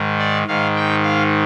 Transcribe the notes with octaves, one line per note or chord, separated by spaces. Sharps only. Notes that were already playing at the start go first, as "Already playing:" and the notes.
Already playing: G#2 D#3
D5
G#2 D#3 F5
G5
F5